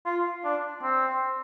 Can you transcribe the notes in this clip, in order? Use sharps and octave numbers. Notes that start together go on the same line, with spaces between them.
F4
D4
C4